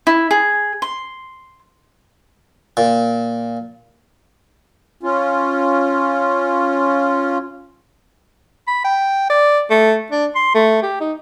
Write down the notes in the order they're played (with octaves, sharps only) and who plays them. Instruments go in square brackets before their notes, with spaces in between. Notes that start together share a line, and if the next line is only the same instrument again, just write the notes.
[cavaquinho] E4
G#4
C6
[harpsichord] A#2
[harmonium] C#4 F4
[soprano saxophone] B5
G5
D5
A3
D4
C6
A3
G4
D#4